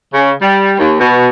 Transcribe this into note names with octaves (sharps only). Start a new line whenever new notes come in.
C#3
G3
D#2
B2